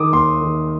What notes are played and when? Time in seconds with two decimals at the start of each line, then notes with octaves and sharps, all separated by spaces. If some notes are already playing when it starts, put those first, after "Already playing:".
Already playing: D#3 D6 D#6
0.12 D#2 C6
0.41 D#3